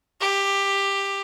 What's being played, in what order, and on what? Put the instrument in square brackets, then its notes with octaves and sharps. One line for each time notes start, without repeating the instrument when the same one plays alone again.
[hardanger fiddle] G4